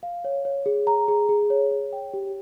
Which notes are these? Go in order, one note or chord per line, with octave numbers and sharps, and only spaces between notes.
F5
C#5
C#5
G#4
A#5
G#4
G#4
C#5
C#5
G5
G4